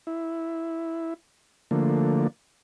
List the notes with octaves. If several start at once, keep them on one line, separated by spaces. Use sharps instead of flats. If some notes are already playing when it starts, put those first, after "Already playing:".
E4
D3 F3 A3 A#3